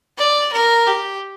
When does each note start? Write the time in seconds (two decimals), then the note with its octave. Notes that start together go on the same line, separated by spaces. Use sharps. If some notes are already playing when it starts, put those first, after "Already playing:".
0.18 D5
0.52 A#4
0.87 G4